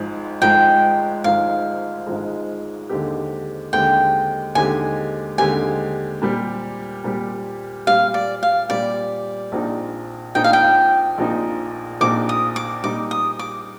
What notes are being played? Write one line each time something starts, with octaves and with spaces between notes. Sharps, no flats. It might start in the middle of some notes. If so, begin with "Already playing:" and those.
Already playing: G#1 G#2 F3 G#3
G#1 G#2 F3 G#3 G5
G#1 G#2 F3 G#3 F5
G#1 G#2 F3 G#3
D#2 D3 G#3 C4 G4
D#2 D3 G#3 C4 G4 G5
D#2 D3 G#3 C4 G4 G#5
D#2 D3 G#3 C4 G4 G#5
A#2 G3 C4 G4
A#2 G3 C4 G4
A#2 G3 C4 G4 F5
D5
F5
A#2 G3 C4 G4 D5
A#1 A#2 F3 C4 D#4
A#1 A#2 F3 C4 D#4 G5
F5
G5
A#1 A#2 F3 C4 D#4
A#1 A#2 F3 C4 D#4 D6
D#6
D6
A#2 G3 C4 D#4 D6
D#6
D6